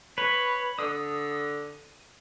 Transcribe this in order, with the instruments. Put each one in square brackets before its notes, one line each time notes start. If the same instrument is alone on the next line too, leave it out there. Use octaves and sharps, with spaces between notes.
[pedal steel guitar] B4 [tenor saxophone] C#5
[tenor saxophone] D3 [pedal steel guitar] D#6